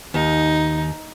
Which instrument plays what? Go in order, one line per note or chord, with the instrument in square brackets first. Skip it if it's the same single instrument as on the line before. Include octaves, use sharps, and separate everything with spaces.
[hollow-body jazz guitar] D#2 [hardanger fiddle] D#4